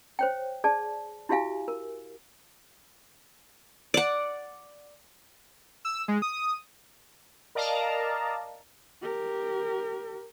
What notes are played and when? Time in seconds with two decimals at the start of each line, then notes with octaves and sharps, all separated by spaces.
0.19 C5 C#5 G5
0.64 G#4 D5 A5
1.29 E4 F#4 G4 E5 F5 G#5
1.68 A#4
3.94 D5 F#5
5.85 E6
6.08 G#3
6.22 D#6
7.55 A#4 D5 D#5 F5 A5 A#5
9.02 G4 A#4